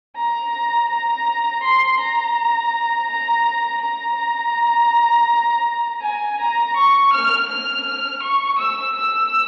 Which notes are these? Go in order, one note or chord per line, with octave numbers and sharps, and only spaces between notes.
A#5
A#5
C6
A#5
A#5
A#5
G#5
A#5
C#6
F6
F6
C#6
E6
E6